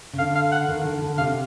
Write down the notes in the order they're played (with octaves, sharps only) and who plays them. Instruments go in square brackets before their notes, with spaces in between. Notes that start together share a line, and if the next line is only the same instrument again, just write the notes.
[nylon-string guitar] C#3
[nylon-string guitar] D3 [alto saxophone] F5
[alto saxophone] F5
F#5
[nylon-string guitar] D#3
D3
D3
[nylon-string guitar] C3 [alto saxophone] F5